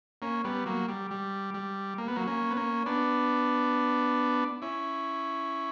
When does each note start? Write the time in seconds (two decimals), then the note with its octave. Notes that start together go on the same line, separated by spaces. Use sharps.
0.22 A#3 C#4
0.44 G3 B3
0.66 F#3 A#3
0.88 G3
1.11 G3
1.54 G3
1.98 A#3
2.08 B3
2.16 F#3 A#3
2.27 A#3 C#4
2.51 B3
2.57 A#3 C#4
2.86 B3 D4
4.62 C#4 E4